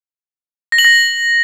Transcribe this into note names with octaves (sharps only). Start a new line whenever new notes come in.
A#6
F#7
A#6